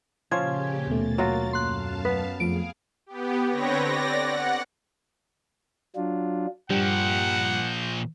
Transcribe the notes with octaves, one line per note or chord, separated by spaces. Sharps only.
A#2 C#3 F3 C#4 F4 G4 G#6
D#2 B2 A3 A#3 A6
F#3 F4 F#4
F#2 F5 A5 C6 F#6
B3 B4
F2 F3 A3 G#4 F5 D7
B3 G4
D3 C4 B4 C#5 G5 A#6
D5 A#6
F#5
F#3 D4 F4
G2 A#2 F3 G3 F#5 G5
G6